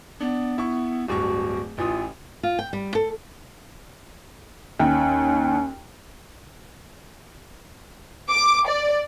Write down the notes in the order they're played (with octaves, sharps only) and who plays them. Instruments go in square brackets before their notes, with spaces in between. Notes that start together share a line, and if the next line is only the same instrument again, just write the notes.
[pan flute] B3 [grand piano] D4
[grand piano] E4 C#6
[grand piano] D1 G2 C#6 [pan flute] F#4
[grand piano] A1 E3 D#6 [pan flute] F4
[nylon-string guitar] F4
G5
G3
A4
[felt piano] D#2 G5 [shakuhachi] C#4
[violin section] D6
D5